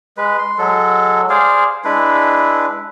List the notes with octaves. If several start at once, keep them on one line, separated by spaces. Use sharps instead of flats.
G#3 B4
C6
F#3 G#3 A4
G#4 C5 D5 F5
G#3 D4 E4 B4